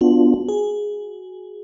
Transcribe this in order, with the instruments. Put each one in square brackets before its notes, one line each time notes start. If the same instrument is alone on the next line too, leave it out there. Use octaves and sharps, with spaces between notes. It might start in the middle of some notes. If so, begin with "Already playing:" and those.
[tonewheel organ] B3 D4 F4 [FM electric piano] F#4
[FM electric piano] G#4